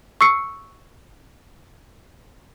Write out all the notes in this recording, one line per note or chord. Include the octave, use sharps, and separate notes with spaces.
C#6 E6 C7 C#7